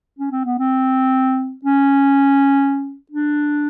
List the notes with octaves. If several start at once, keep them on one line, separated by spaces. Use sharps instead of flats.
C#4
C4
B3
C4
C#4
D4